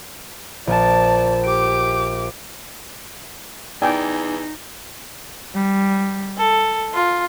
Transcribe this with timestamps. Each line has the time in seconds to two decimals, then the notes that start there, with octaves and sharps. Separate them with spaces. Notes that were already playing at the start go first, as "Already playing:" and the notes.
0.67 A#1 D5 A5
1.44 G4 D6 D7
3.82 E2 D#4 D5 G5 G#5 A#5
5.54 G3
6.37 A4
6.93 F4